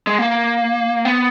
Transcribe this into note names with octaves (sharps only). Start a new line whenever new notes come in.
G#3
A#3
B3